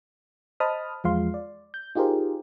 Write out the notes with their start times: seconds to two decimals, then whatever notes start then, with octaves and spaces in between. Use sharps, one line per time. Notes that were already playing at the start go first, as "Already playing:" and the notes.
0.60 C5 D#5 A5 B5 D#6 F6
1.04 E2 F3 G#3 F5 C6
1.34 D5
1.74 G6
1.95 D#4 F4 G4 G#4 A#4 C5